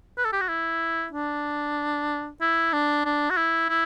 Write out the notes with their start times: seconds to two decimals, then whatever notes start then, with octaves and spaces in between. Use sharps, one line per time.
0.18 B4
0.25 A4
0.33 G4
0.41 F#4
0.49 E4
1.13 D4
2.41 E4
2.73 D4
3.05 D4
3.30 F#4
3.37 E4
3.69 E4